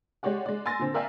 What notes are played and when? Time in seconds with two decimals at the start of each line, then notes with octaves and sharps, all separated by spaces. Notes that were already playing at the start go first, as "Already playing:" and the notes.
0.23 G#3 G4 C#5 D5 F#5
0.46 G#3 D5
0.66 G#5 C6 E6 A6 A#6
0.79 A#2 D3 C4
0.94 A#4 D5 E5 F5 G5 G#5